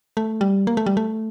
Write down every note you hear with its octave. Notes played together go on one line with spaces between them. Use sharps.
A3
G3
A#3
A3
G3
A3